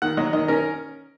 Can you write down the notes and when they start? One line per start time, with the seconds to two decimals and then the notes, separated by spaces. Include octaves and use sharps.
0.02 D#3 F#5
0.17 F#3 D#5
0.33 D#3 D#5
0.48 C#4 A#4